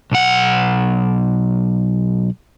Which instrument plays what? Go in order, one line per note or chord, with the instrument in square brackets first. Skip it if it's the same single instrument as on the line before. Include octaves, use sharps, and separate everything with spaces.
[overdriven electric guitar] B1 F#5